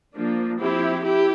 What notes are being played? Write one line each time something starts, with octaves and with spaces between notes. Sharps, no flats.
F3 A#3 D4
F3 C4 E4 G4
E4 G4